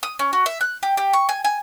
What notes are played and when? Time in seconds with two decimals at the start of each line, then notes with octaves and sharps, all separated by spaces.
0.03 D#6
0.19 C#4
0.33 F#4
0.46 E5
0.61 F#6
0.83 G4
0.97 G4
1.13 C#6
1.29 G#5
1.45 G#5